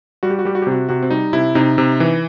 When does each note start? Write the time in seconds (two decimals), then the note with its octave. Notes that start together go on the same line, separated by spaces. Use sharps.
0.23 G3 F#4
0.30 G4
0.39 F#4
0.45 G3 G4
0.55 F#4
0.62 G4
0.67 C3 F#4
0.89 C3 F#4
1.03 C4
1.11 G3 D#4
1.33 C3 E4
1.55 C3 D#4
1.78 C3
2.00 E3